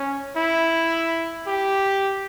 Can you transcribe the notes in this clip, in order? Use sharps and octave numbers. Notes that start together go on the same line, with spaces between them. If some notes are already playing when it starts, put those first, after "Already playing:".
Already playing: C#4
E4
G4